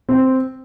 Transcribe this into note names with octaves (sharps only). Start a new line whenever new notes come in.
C4